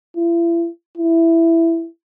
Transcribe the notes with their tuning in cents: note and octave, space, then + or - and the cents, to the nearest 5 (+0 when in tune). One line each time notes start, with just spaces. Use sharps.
E4 +40
E4 +10